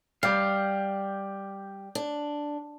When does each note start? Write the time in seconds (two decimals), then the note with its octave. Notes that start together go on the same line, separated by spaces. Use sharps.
0.23 G3 G4 F5
1.95 D4